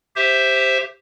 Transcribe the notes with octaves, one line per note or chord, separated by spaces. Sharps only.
G4 C5 E5